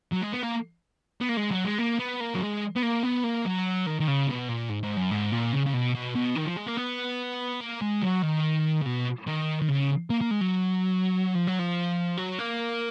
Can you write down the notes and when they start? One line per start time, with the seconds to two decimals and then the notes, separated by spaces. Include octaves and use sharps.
0.13 F#3
0.23 G#3
0.34 B3
0.44 A#3
1.21 B3
1.29 A#3
1.37 G#3
1.51 F#3
1.65 G#3
1.79 A#3
1.99 B3
2.20 A#3
2.35 F#3
2.41 G#3
2.76 B3
2.83 A#3
3.03 B3
3.24 A#3
3.45 F#3
3.86 D#3
4.00 D#3
4.08 C#3
4.28 B2
4.49 A#2
4.70 G#2
4.83 G#2
4.97 F#2
5.11 G#2
5.32 A#2
5.53 C#3
5.66 C#3
5.74 B2
5.95 B2
6.15 B2
6.36 D#3
6.46 F3
6.57 G#3
6.67 A#3
6.77 B3
7.61 A#3
7.82 G#3
8.03 F#3
8.23 D#3
8.82 C#3
8.86 B2
9.27 D#3
9.61 D#3
9.68 C#3
10.10 A#3
10.21 A#3
10.31 G#3
10.41 F#3
11.35 F3
11.48 F#3
11.59 F3
12.17 F#3
12.39 A#3